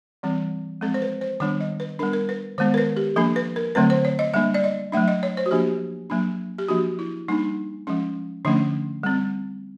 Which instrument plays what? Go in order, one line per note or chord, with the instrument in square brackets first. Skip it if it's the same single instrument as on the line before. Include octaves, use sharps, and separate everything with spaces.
[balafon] E3 G3 C4
F3 G#3 C4 A4
C5
B4
C5
D#3 G3 B3 D4 C#5
D#5
B4
G3 B3 D4 A#4
A#4
B4
D#3 G#3 B3 C5
A#4
B4
G4
F3 A#3 D4 A4
B4
A#4
D3 F#3 A3 C4 B4
C5
C#5
D#5
G3 A#3 D4 E5
D5
D#5
F#3 A3 D4 E5
D#5
C#5
C5
F#4
F3 A#3 D4 G4
F#3 A#3 D4
G4
F3 A#3 D4 F#4
E4
G3 A#3 D4 D#4
F3 G#3 C#4
D3 F3 A3 C#4 D4
G3 C4